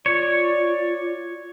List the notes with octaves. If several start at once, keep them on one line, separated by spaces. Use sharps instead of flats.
F4 C#5 D5